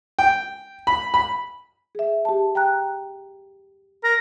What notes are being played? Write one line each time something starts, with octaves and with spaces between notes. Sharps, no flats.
G5
B5
B5
G#4 E5
G4 A5
G5 A#5 F#6
A#4